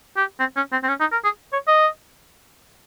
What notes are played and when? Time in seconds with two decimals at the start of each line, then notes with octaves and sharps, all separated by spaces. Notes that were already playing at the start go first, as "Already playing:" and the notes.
0.17 G4
0.40 C4
0.56 C#4
0.72 C4
0.83 C4
0.88 C#4
1.00 D#4
1.12 A#4
1.24 G#4
1.53 C#5
1.68 D#5